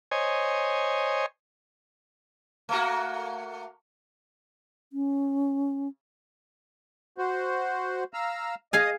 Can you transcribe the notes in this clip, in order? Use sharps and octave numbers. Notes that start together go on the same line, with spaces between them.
C5 C#5 D#5 G#5
A3 A#3 F#4
C#4
F#4 C5
F5 A#5 E6
G#4 D#5 F5 G#5 D#6